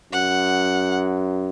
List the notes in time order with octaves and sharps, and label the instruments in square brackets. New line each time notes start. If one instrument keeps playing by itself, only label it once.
[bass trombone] F#2 [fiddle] F#5